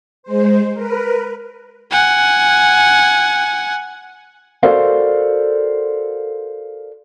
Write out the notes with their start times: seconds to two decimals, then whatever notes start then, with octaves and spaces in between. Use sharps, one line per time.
0.23 G#3 C5
0.74 A#4 B4
1.90 F#5 G#5
4.63 F#4 A4 A#4 C5 D5 F5